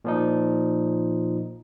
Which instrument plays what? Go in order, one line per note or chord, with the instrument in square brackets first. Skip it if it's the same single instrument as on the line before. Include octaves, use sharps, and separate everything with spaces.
[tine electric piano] A#2 F3 D#4